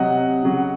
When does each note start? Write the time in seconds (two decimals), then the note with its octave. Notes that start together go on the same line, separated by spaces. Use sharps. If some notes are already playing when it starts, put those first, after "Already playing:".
Already playing: C3 F#3 D#5 F#5
0.43 C#3 F#3